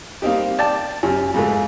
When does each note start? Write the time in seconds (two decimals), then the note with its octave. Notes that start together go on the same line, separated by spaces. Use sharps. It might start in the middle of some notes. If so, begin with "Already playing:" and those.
0.22 G3 A#3 C4 D#4 G4
0.59 D5 G5 A5
1.03 F#2 C3
1.34 F2 G#2 A3